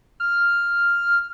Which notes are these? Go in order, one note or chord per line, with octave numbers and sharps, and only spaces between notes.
F6